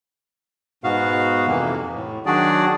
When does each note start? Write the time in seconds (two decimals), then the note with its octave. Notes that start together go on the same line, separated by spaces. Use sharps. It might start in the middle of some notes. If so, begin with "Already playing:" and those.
0.84 G#2 B2 B3 F#4 F5
1.47 F2 C3 E3 A#3
1.94 A2
2.26 D#3 F#3 D4 F#4 G#4 D5